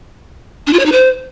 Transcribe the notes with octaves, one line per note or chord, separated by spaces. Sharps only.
D4
F4
C#5
D#4
C5